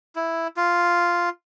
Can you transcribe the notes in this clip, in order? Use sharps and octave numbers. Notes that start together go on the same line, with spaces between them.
E4
F4